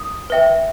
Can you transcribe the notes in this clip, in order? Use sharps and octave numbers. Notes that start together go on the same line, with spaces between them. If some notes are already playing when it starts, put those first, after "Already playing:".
Already playing: D#6
B4 E5 G5